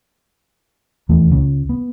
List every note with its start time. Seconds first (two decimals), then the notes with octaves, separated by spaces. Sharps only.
1.09 D#1 E2 E3 A3
1.31 C#2 C#3
1.69 B3